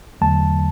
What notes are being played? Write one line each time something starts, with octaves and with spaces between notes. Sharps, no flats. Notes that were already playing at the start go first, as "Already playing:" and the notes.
E2 D3 F#3 A3 A5